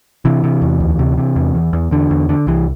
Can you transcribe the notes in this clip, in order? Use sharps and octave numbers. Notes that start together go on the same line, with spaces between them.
C3 E3
C3
E2
D2
C3
C3
E2
E2
E2
E2 D3
E2
D3
C2 E3